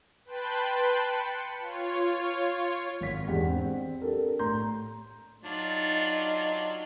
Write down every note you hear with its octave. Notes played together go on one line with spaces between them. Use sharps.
B4 G5 A5 C6 F#6
C#7
F4 C#5
G#1 B6
E2 G#2 D4 G4 F#5
C4
D4 G4 A4 A#4
A2 A#5 C6 G6
F#3 D4 D#4 F4